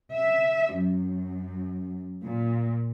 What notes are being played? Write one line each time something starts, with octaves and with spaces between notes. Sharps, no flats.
E5
F#2
A#2